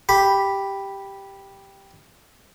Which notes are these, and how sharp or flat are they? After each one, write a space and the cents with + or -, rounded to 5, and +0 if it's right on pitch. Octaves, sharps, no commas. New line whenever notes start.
G4 +0 B5 -5